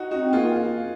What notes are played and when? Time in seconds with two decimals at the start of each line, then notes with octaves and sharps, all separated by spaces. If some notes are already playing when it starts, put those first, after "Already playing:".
Already playing: D#4 F#4
0.11 C#4 D#4 F#4
0.18 C4
0.33 A#3 F4 G#4